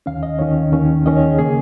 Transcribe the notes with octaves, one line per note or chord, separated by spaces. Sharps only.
D#2 D#3 C#4 F5
D#5
D#2 D#3 C#4 C#5
D#2 D#3 C#4
D#2 D#3 C#4 D#5
C#5
G#4
C#3 A#3 G#4